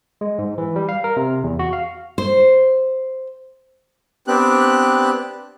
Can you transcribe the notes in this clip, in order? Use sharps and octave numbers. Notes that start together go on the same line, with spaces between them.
G#3
G#2
E3
G3
F5
A#4
C3
E2
F#4
F5
C5
B3 C4 D4 G4 F#6